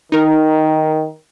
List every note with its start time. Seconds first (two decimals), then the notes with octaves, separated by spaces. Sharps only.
0.12 D#3 D#4 A#4